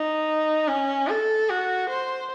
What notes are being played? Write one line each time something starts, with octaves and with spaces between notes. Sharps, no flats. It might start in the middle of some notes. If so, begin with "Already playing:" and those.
Already playing: D#4
C#4
A4
F#4
C5